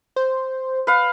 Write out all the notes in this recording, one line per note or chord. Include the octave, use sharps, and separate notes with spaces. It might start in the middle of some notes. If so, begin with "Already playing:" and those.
C5
B4 F5